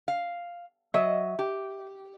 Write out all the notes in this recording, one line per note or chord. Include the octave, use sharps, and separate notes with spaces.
F5
F#3 D#5 E5
G4